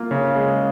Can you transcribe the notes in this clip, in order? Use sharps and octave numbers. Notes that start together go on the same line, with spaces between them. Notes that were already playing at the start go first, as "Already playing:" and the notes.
Already playing: A#3 F4
C#3
G#3